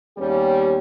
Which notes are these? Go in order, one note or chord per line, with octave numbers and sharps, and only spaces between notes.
D#2 G3 B3 C#4 G4